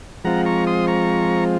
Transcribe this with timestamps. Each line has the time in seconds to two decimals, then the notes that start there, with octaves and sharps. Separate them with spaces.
0.24 F3 G#3 C4 F4 F#5 A#5
0.45 A#5 C#6
0.67 C6 D#6
0.87 A#5 C#6